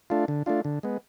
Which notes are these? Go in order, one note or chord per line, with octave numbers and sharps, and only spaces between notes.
A3 D4 F4
D3
A3 D4 F4
D3
G#3 B3